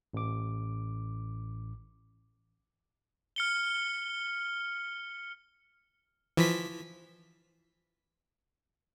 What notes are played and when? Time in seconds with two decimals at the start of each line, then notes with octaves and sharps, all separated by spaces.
0.13 A1 D6
3.36 F6 C#7 G7
6.37 E3 F3 B6